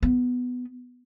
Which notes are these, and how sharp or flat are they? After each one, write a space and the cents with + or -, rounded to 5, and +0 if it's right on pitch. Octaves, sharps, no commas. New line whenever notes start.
B3 +10